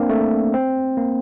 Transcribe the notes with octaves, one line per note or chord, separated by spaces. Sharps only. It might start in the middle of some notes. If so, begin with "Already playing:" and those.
Already playing: A#3 C4 D4
A3
C4
A#3